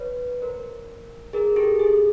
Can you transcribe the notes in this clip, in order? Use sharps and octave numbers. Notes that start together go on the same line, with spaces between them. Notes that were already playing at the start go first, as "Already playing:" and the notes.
Already playing: B4 C#5
A#4 C5
G#4 A#4
G4 A4
G#4